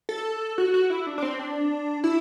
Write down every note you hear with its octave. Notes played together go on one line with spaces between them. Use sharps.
A4
F#4
F#4
E4
D4
D4
C4
D4
E4